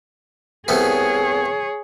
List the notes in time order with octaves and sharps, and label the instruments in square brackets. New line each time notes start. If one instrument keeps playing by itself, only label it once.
[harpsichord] C2 A3 B3 [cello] G#4 C#5